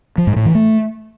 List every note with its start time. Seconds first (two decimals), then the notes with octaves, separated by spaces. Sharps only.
0.18 F3
0.27 G#2
0.36 A2
0.45 E3
0.55 A3